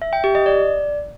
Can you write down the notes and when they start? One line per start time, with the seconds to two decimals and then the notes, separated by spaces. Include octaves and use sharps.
0.02 E5
0.13 G5
0.24 G4
0.35 D#5
0.46 D5